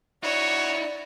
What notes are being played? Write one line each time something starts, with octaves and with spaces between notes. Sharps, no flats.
D#4 E4 F#4 C#5 D5